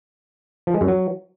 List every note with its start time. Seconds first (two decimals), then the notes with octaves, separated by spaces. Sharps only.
0.67 F3
0.74 G#3
0.81 F#2
0.88 F#3